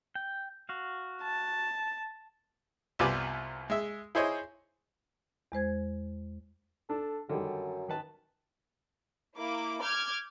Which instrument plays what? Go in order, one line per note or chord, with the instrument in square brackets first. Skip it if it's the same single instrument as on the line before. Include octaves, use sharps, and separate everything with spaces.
[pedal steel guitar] G5
F#4 F5
[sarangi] A5
[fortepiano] C2 B3 F4 G4 D5 G#5
G#3 E5
E4 G#4 C5 C#5 D#5
[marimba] E2 G#3 C5 G#6
[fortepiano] D4 [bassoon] A4
[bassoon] F#2 [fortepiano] D3 D#3 G3
[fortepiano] D#3 B4 A5
[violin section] A#3 E4 D6
D6 F6 G6 G#6